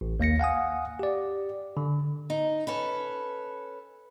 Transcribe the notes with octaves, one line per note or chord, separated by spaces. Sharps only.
A1
D#2 A#3 A#6 C#7
F5 F#5 G#5 D#6
G4 D5
D3
D#4
C#4 A4 B4